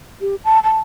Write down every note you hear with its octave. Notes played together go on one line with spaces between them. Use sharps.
G4
A5
A5